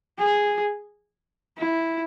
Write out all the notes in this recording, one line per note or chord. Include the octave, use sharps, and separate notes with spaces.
G#4
E4